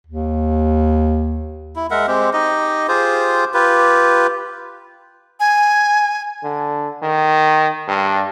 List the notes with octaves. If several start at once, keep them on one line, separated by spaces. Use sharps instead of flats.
D#2
E4
G#3 A#4 E5 F#5
G#3 C4 G4
D#4 G4 D#5
F4 G4 G#4 C5
F4 G4 B4
G#5
D3
D#3
G2